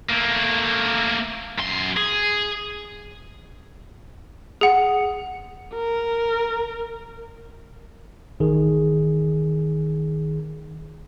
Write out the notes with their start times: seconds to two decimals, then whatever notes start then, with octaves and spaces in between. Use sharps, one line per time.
0.10 A3 A#3
1.59 F#2 C6
1.97 G#4
4.61 G#4 F#5
5.74 A#4
8.40 A1 D#3 G#4